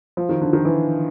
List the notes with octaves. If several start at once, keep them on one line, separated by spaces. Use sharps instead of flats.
F3
D#3
D3
D#3
E3